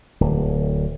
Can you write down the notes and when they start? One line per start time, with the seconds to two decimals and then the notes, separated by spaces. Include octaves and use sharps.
0.21 D1